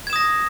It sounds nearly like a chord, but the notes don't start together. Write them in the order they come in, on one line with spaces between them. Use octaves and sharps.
G#6 E7 D#6 A#6